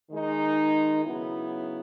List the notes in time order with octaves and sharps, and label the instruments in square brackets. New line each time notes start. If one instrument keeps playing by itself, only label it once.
[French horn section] D#3 G#3 D#4
C#3 F#3 B3 E4